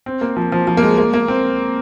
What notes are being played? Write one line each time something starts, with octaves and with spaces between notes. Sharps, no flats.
C4
A#3
F3
F3
F3
A#3
G#3
A#3
A#3
C4